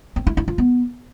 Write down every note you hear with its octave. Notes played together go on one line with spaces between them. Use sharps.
C4
E4
E4
F4
B3